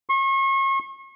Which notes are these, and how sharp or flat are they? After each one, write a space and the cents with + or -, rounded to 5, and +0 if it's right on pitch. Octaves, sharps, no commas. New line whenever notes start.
C#6 -40